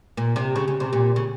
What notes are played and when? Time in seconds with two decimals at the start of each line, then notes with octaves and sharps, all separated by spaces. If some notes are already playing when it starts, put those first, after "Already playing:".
0.17 A#2
0.36 C3
0.56 C#3
0.68 C#3
0.80 C3
0.93 A#2
1.16 C#3